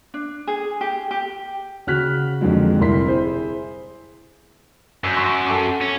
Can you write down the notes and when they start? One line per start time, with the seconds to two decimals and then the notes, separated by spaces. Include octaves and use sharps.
0.14 D4
0.47 G#4
0.81 G4
1.11 G4
1.87 C#3 F#4 F6 F#6 B6
2.41 F2 D3 D#3 F#3 G#3
2.79 F1 G3 E4 A#4 C6 B6
3.06 E4 G#4 C5
5.04 F#2 E6 G6
5.16 C6 C#6 E6
5.46 A4 G#5 D6
5.82 C#4